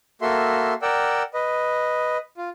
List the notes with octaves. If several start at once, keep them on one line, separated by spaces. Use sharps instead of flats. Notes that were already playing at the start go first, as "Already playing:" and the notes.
A#3 F#4 A4 E5 C6
A#4 D5 F#5 G5 E6
B4 D#5
F4